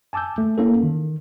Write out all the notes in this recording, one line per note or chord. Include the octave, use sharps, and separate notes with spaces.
G#5 A5 D6 E6 G6
A3
A#3 C#4 E4 A4
D#3